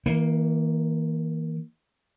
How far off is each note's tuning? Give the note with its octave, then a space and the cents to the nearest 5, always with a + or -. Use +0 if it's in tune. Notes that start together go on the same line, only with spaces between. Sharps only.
E3 -40 A#3 +0